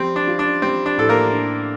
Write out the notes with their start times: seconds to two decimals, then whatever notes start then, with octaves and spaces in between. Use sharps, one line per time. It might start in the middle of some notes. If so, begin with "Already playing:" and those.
Already playing: F3 G3 C4 G4
0.16 D4
0.27 F4
0.39 D4
0.62 G3 C4
0.86 D4
0.98 A2 A4
1.09 A#3 A#4
1.32 D4